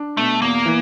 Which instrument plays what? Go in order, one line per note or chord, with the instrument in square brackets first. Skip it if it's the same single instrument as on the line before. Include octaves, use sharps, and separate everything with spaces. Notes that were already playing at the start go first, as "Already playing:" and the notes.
Already playing: [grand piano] D4
[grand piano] B2 [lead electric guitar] A3
[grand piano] E2 [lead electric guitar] A#3
[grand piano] E3